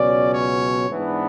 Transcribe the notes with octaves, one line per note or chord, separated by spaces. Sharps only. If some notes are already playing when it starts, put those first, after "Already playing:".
Already playing: C#2 B2 F#3 C#4 D5
C#5
G#2 E3 B3 D4